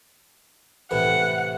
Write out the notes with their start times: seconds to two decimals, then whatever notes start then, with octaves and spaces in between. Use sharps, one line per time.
0.91 A2 C3 E3 F#5